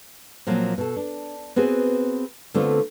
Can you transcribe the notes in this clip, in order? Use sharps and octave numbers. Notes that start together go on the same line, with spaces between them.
A#2 F3 F#3 A#3 C4
B2 A4
D4
B3 C4 F#4 G#4
D3 A3 B3 C4 F4